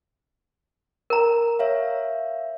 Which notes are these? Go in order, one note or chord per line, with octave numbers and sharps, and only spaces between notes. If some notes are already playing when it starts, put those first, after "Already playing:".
A#4 A#5
C#5 E5 F5